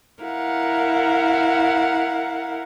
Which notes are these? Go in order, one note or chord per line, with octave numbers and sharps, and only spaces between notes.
E4 A#4 F5 F#5